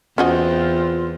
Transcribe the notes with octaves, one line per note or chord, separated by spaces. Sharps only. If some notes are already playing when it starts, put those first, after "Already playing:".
E2 C4 C#4 F4 F#4 D#5